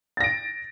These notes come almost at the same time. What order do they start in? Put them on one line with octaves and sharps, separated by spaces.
A6 A#6 D7